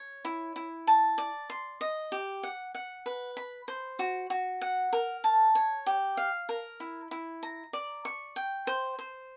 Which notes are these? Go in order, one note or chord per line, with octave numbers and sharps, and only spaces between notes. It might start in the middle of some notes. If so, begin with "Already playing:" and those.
Already playing: C#5
E4
E4
A5
D5
C6
D#5
G4
F#5
F#5
B4
B5
C5
F#4
F#4
F#5
A#4
A5
C#5
G4
F5
A#4
E4
E4
A#5
D5
C#6
G5
C5
C5